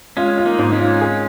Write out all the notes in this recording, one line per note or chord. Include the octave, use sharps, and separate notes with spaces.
G#3 C#4 F4
F4
A#3 D#4
G#2
G#3 C#4
F4
G#4